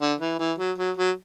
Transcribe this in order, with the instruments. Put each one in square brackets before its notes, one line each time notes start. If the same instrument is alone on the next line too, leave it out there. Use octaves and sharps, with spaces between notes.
[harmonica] D3
E3
E3
F#3
F#3
F#3